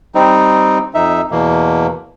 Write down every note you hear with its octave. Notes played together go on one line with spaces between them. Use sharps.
G3 C4 D#4
F2 D#4 E5
E2 B2 A#3